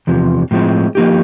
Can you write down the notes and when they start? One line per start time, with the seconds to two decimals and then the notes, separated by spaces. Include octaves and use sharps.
0.07 E2 C3 F3
0.51 A2 F3 G#3 C4
0.95 F3 A#3 D#4 G4